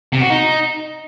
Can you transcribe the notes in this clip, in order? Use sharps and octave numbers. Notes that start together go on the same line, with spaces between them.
C3
F#4
D#4